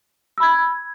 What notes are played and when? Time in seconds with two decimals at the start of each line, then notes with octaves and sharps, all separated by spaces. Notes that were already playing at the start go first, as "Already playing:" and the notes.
0.38 E6
0.40 B5
0.43 G#6